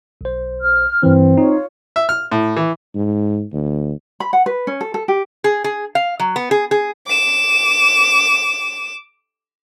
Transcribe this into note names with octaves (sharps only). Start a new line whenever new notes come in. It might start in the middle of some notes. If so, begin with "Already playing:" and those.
B1 C5
F6
G2 E3 C4
D#4 F4 C#5
E5
F6
A2
E3
G#2
D2
B5
F#5
B4
C#4
A4
A4
G4
G#4
G#4
F5
F#3
B3
G#4
G#4
D6 E7